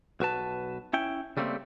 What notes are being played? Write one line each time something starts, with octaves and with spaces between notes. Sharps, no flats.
B1 F#4 B4 A5
C#4 E4 G5
C#3 G3 A3 A#3 C4